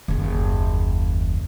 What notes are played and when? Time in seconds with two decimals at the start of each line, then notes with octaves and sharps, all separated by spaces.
0.08 F#1 D#2